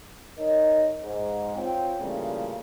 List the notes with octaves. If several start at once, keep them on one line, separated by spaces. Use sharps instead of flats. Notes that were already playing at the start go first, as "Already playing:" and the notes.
D#4 A#4 C#5 D#5
G#2
C4 F4 C#5 G5
A#2 C#3 E3 G3 A3